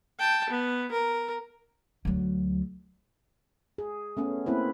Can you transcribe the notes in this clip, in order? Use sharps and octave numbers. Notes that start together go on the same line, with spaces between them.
G5 A5
B3
A#4
D2 F#3
G#4
A3 B3 C#4
A#3 C4 E4 B4